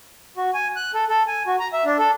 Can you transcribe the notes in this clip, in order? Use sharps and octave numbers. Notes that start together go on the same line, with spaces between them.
F#4
G#5
F#6
A4
A4
G#5
F#4
A#5
E5
D4
A4